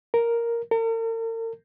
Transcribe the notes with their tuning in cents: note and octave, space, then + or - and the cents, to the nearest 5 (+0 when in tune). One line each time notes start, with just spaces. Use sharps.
A#4 +0
A#4 -45